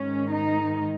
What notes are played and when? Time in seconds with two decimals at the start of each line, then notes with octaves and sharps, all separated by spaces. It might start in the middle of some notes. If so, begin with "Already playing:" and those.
Already playing: G#2 D#3 G#3 C#4
0.31 D#4